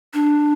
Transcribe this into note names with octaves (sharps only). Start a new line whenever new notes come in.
D4